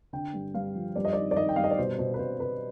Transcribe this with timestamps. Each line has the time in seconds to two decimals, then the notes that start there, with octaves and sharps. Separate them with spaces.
0.13 D3 G5
0.33 G2
0.54 G2 F5
0.75 F3
0.96 G2 D5
1.05 D#5
1.13 D#3 D5
1.31 D5
1.36 D#3 D#5
1.49 G5
1.56 G2 F5
1.64 D#5
1.71 D5
1.78 B2 C5
1.98 B2 C5
2.14 B4
2.19 B2 C5
2.40 B2 B4